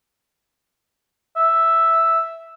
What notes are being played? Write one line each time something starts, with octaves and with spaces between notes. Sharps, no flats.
E5